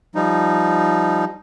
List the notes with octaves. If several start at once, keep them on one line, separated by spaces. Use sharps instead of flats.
F3 G3 D#4